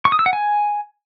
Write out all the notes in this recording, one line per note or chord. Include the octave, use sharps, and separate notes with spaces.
C#6
D#6
E6
F#5
G#5